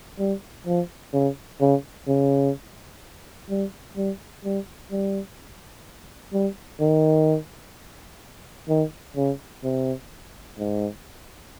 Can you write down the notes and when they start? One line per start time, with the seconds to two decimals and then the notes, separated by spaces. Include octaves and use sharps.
0.19 G3
0.66 F3
1.13 C#3
1.61 C#3
2.08 C#3
3.50 G3
3.97 G3
4.45 G3
4.91 G3
6.33 G3
6.80 D#3
8.69 D#3
9.17 C#3
9.64 C3
10.59 G#2